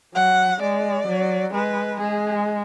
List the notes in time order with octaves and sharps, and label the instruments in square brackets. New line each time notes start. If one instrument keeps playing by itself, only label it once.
[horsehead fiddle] F#3 [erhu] F#5
[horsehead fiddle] G#3 [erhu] D5
[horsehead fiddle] F#3
[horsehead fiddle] G#3 [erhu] B4
[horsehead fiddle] G#3 [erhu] G#4